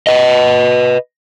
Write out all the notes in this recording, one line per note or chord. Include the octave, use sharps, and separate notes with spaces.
B4 D#5